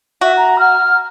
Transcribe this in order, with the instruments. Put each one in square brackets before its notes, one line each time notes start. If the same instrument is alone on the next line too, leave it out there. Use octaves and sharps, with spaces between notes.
[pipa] F#4 [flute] E5
[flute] A#5
F6